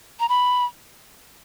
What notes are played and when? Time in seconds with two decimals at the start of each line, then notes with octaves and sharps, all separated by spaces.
0.20 A#5
0.29 B5